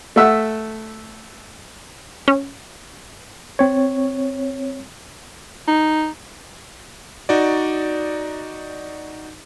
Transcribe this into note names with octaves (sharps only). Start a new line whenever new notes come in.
A3 E5 F#5
C#4
C4 C#5
D#4
D#4 F#4 D5